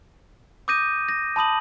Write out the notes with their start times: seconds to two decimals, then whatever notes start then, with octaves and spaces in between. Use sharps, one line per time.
0.68 D6 D#6 G6 A#6 D#7
1.09 A#6
1.36 A5 B5 D#6 F#7